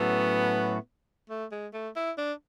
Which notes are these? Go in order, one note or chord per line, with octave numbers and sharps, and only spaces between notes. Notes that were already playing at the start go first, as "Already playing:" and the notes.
Already playing: A2 F#3 B3 C#4 F#4 A4
A3
G#3
A3
E4
D4